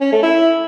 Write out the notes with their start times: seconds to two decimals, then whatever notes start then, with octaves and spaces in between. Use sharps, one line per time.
0.01 C#4
0.12 A3
0.23 E4